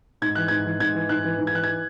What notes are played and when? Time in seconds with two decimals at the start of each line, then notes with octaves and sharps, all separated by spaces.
0.22 G#2 G#6
0.35 E3 F#6
0.48 G#2 G#6
0.66 E3
0.80 G#2 G#6
0.95 E3
1.09 G#2 F#6
1.24 E3
1.38 G#2
1.47 G#6
1.53 E3 F#6
1.64 G#6